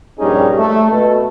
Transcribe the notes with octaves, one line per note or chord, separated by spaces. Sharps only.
A#1 G2 G3 C#4 D#4 G#4
A3
B2 A4